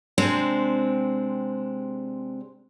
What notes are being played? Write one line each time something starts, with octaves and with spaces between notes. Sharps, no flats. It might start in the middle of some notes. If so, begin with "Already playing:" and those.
C3 G#3 C4 D4